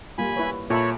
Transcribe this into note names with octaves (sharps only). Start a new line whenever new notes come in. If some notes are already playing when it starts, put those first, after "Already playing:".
G3 A#3 F4 G#5 B5
E4 B4 C#5
A#2 A4 C#5 E5 B5